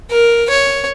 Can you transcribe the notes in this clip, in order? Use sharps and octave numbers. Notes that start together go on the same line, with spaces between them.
A#4
C#5